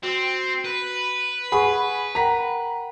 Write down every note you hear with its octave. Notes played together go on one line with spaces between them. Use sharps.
C4 F#4
B4
G#4 F#5 G#5 B5 C#6
A#4 F#5 G5 A#5 B6